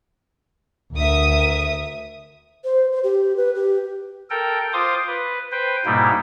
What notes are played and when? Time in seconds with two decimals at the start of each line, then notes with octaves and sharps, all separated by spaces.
0.95 D2 A#4 E5 D#6
2.65 C5
2.92 C5
3.04 G4
3.37 B4
3.55 G4
4.30 A4 A#4 G5
4.73 F4 C5 C6 D6 D#6
5.07 B4
5.52 B4 C5 G5
5.85 G#2 B2 G3 A#3 D#4 E4